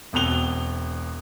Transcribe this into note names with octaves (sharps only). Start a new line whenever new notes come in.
E1 B2 C4 F#6 F7 G7